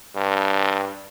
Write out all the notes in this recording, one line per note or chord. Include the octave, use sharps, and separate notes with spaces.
G2